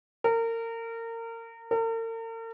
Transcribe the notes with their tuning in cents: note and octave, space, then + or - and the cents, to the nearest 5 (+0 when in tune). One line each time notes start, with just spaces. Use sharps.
A#4 -30
A#4 -45